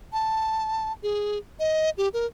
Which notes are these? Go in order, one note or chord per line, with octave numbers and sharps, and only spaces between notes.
A5
G#4
D#5
G4
A#4